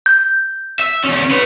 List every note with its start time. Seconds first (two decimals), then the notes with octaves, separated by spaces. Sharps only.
0.06 G6
0.79 E5
1.04 E2 C#4
1.31 B4 C#5